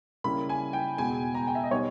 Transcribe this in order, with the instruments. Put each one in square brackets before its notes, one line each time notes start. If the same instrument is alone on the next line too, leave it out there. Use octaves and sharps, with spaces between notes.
[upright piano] C#3 G3 A#3 E4 [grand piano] B5
[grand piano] G#5
G5
[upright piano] E2 B2 G#3 [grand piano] G#5
[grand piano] A#5
G5
E5
D#5
[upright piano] B2 G3 B3 D#4 G4 [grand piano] C#5